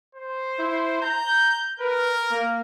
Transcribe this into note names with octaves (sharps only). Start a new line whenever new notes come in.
C5
E4
A#5 G6
A#4 B4
A#3